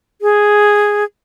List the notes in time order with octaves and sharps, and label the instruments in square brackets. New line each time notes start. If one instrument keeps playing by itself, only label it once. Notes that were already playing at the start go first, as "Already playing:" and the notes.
[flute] G#4